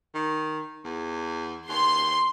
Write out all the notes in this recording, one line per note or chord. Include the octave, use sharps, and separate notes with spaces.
D#3
E2
D#2 C6